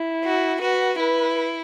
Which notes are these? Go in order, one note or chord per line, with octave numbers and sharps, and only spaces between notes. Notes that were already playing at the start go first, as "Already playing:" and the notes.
Already playing: E4
F#4
F#4 B4
E4 B4